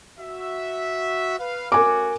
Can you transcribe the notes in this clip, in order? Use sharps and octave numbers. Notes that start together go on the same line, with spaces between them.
F#4 E5
B4 F5
A3 C#4 F#4 A#4 G#5 D6